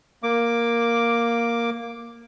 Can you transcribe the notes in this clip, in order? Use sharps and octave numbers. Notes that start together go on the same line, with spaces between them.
A#3 D6